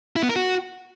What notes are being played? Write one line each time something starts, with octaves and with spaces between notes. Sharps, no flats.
E4
B3
A#4
F#4